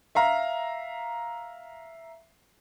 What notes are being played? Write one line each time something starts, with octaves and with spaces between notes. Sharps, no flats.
E5 F5 A#5